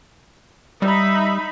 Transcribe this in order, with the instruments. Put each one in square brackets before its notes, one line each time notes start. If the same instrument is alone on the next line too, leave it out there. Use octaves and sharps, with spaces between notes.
[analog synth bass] G3 [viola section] D#4 E5 B5